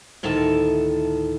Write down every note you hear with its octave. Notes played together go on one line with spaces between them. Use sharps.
D2 A2 D#3 A4 A5